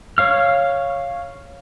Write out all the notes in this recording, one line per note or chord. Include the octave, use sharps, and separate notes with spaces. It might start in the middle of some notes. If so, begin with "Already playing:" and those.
C#5 F5 F6